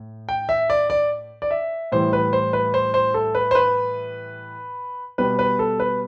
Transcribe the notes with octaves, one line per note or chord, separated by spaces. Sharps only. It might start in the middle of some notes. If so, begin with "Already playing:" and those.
Already playing: A2
G5
E5
D5
D5
D5
E5
A2 E3 G3 C5
B4
C5
B4
C5
C5
A4
B4
C5
B4
B2 G3 B4
B4
A4
B4